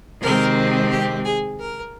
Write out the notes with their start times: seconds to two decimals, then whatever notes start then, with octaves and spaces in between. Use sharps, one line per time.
0.21 C3 D#3 G#3 C4 A#4
0.91 G4
1.25 G#4
1.60 A#4